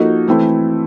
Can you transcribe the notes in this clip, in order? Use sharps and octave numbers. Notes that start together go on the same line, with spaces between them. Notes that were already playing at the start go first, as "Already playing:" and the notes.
Already playing: F3 A#3 D#4 F#4 A4
E3 A3 C4 E4